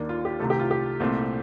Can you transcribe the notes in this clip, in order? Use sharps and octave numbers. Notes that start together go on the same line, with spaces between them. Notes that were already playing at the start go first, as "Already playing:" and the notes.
Already playing: D#2 D#3 A#3 D4
F4
G4
C2 C3 D#3 A3 C4 A4
G4
F4
G4
C2 A#2 A3 C4